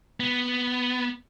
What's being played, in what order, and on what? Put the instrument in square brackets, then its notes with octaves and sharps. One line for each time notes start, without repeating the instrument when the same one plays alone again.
[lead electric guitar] B3